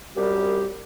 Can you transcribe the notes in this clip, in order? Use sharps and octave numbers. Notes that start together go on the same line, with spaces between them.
C2 F#2 G3 G4